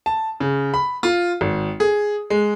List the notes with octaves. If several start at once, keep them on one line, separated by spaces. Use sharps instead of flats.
A5
C#3
B5
F4
G#1
G#4
G#3